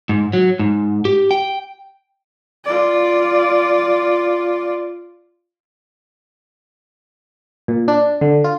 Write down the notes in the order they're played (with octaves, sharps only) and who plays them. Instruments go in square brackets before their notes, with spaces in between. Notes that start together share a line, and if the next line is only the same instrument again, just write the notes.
[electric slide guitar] G#2
F#3
G#2
G4
G5
[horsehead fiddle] F4 D5
[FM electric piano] A#2
D4
D3
F4